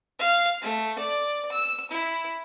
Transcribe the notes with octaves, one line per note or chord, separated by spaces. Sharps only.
F5
A3
D5
E6
E4